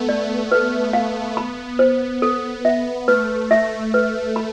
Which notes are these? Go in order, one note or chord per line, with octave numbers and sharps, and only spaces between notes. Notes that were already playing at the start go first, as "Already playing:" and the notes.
Already playing: A3 B3
D5
B3
B4
F5
B5
C5
B3 A4
B3 E5
A3 B4
A3 E5
B4
B5